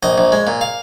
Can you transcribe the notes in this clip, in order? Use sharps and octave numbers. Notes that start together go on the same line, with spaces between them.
A#1 D#5
A#1
G#3
A#2
F5